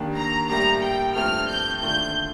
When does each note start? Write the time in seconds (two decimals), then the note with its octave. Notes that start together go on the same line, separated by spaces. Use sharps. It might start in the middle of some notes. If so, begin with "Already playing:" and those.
Already playing: D#2 D#3 A#3 D4 G4
0.16 A#5
0.49 A2 G3 A#3 A#5
0.83 G5
1.16 G2 F3 A3 C4 G4 F6
1.49 G6
1.83 D#2 D3 A3 D4 F4 G6